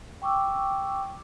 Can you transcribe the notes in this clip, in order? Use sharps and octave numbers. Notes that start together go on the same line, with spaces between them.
G5 C#6 D6 E6